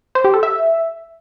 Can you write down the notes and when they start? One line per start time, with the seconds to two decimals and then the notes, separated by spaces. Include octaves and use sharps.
0.15 C5
0.24 G4
0.34 A4
0.43 E5